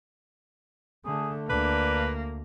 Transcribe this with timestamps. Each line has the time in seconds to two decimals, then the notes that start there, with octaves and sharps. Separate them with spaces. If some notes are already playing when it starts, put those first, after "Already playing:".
1.05 D3 A3 G#4
1.49 D2 A#3 D4 B4